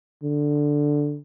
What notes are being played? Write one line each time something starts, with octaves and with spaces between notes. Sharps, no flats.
D3